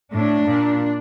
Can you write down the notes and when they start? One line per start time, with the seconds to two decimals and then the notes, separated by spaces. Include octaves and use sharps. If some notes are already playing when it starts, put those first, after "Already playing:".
0.13 A2 D4
0.48 A#2